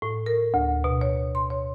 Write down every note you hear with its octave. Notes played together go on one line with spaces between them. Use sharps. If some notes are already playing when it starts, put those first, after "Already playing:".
A2
A#4
D2
B2
C#5
C6
C#5